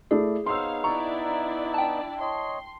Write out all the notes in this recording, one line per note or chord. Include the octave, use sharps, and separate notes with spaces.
A3 E4 G#4 D5
B3 D#4 C5 C#5 F5 C6 E6
D4 E4 D5 A#5 C#6
G5 A5
C#5 D#5 C6